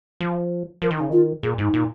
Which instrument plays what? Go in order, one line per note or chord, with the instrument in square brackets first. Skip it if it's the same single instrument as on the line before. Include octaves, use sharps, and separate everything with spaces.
[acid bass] F3
[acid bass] F3 [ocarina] A#4
[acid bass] D#3
[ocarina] D#4
[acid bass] C#3
[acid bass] D#3 [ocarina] F4
[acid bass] A#2 [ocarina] G#4
[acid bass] G#2 [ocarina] D#4
[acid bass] A#2